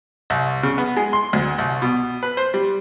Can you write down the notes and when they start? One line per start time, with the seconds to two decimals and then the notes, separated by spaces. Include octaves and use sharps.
0.30 C2
0.63 C#3
0.78 B3
0.97 G#3
1.13 C6
1.33 D2
1.58 C2
1.82 B2
2.23 B4
2.37 C5
2.54 G3